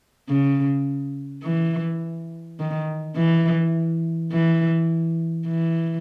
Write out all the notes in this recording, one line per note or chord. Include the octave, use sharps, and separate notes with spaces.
C#3
E3
D#3
E3
E3
E3